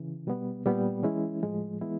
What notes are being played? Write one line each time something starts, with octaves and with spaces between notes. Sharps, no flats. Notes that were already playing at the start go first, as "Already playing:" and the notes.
Already playing: C#3 E3
B2 G3 B3
A#2 G3 B3
E3 G#3 C#4 E4
A2 F3 G#3
E3 G#3 B3 E4